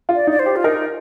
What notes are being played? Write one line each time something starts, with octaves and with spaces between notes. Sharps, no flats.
F4
D5
D#4
D5
C5
G4
F4
D#4 A#4